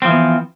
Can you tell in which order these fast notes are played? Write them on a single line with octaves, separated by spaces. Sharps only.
C4 F3 E3 B3